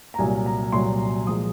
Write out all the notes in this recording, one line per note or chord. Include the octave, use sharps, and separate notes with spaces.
A#5
C2 A#2 F#3 G#5
A#5
C2 A#2 F#3 C6
A#2 F3 G#3 D#6